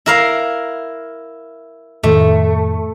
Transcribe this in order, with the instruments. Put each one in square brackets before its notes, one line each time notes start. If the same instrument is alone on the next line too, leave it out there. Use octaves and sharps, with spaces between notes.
[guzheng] E4 A#4 F5
[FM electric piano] F2 A2 D#3 [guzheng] A3